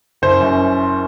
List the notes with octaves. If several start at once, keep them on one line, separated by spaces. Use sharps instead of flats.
F#1 C5
F#2